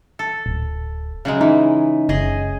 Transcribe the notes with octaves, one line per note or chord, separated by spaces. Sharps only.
A4
D1
C#3 F#3 G#3
E3 D#4
F#1 G#4 D#5